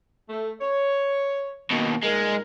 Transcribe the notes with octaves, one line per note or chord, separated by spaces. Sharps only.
A3
C#5
D#2 B2 D#3
A#2 G#3 D#4 A#4